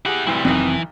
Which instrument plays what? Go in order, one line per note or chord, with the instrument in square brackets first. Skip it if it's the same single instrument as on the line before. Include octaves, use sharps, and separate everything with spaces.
[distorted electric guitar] E4 F#5 [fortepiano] G4 G#4
[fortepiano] D2 G2 E3 [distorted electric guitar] C4 E4
[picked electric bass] F1 C4 [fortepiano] B1 D#3 [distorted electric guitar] E3